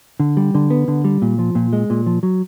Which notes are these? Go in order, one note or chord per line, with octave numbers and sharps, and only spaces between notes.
D3
G3
D3
B3
D3
G3
A#2
F3
A#2
G#3
A#2
F3
F#3